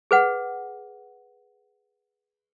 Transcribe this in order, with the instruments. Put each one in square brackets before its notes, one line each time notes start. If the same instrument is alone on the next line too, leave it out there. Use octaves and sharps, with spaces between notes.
[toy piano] G#4 B4 F#5